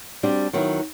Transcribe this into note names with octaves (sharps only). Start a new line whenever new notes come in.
G3 C4 D4 F#4 G4
D#3 F#3 B3 E4